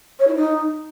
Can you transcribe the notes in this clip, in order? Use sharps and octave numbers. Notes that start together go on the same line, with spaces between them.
C#5
E4
D#4